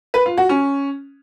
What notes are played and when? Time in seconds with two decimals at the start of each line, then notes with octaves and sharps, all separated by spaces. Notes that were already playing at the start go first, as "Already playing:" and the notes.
0.14 B4
0.26 F4
0.38 F#4
0.49 C#4